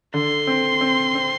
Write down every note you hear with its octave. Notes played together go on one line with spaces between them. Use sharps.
D3 C6
C4
C4
C4